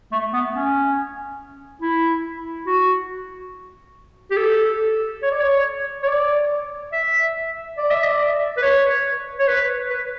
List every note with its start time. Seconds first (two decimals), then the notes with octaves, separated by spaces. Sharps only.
0.12 A3
0.33 B3
0.54 C#4
1.82 E4
2.67 F#4
4.31 G4
4.37 A4
5.22 C#5
5.31 D5
5.40 C#5
6.03 C#5
6.08 D5
6.93 E5
7.78 D5
7.91 E5
8.04 D5
8.57 B4
8.63 C#5
9.39 C#5
9.48 B4
9.90 B4